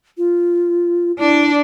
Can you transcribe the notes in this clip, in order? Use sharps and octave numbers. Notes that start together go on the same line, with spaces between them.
F4
D4 E4 D5